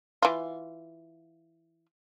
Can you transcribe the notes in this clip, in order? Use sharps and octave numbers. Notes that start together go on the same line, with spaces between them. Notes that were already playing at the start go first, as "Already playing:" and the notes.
E3 F4